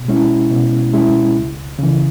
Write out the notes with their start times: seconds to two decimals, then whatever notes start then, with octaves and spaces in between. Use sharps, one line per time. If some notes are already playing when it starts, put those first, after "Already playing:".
Already playing: B2
0.08 G#3 C#4 E4
0.50 B2
0.94 G#3 C#4 E4
1.36 C#2
1.79 C#3 E3